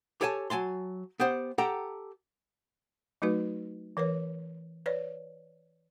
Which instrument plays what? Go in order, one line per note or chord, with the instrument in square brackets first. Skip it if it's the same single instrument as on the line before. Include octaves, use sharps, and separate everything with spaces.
[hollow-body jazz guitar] G4 A4 C#5 F#5 G#5 A5
F#3 G#5 A5 C6
B3 G4 C5 F#5
G4 A4 F#5 G5 A#5
[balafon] F#3 A3 D#4 F#4 B4
E3 A#4 B4 C#5
B4 C#5 D5